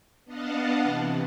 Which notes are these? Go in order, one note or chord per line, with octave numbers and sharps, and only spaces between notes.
B3 D4 D#5 F5 F#5 A5
C3 E3